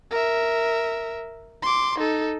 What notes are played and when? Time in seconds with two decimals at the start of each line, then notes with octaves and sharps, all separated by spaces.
0.11 A#4 E5
1.62 C6 D6
1.98 D#4 A4